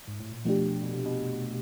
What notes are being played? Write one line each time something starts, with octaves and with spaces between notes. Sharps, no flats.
G#2
A2
A#2
B2 F3 A3 D4 G4
B2
C3
B2